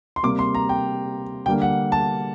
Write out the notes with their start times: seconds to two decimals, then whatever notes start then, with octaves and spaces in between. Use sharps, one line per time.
0.16 C6
0.23 C3 G3 A#3 D6
0.39 C6
0.55 A#5
0.69 G5
1.46 D3 G3 A#3 G5
1.62 F#5
1.92 A5